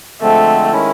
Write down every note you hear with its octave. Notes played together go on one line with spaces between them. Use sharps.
D3 F3 G#3 A3 C4
D#3 G#3 C#4 E4